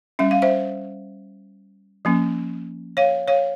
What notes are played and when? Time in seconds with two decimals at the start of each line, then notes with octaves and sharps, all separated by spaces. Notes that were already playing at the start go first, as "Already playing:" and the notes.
0.19 G3 C#4 E5
0.31 F5
0.42 C5 E5
2.05 F3 A#3 C#4
2.97 C#5 F5
3.28 C#5 F5